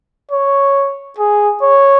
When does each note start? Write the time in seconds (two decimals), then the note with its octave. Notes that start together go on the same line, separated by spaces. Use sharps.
0.31 C#5
1.19 G#4
1.63 C#5